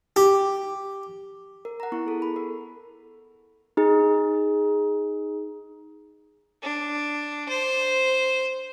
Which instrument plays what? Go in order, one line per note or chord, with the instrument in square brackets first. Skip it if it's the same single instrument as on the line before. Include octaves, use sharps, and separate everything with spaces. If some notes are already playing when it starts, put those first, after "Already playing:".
[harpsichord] G4
[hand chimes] A#4
F#5 A#5
B3 E4 C#6
G#4 A4
B5
A#4
[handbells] D#4 G#4
[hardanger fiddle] D4
C5